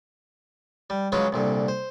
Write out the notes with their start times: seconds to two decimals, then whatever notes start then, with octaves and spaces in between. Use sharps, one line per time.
0.90 G3
1.12 C#3 F#3 G#3 F4 B4 B5
1.32 C2 A#2 D3
1.68 C5